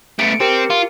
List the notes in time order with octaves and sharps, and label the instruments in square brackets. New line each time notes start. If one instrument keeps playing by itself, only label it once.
[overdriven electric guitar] A3 B3 [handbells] C#7 D7
[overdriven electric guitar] C4 [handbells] G4 A#4 C#7
[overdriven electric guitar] F4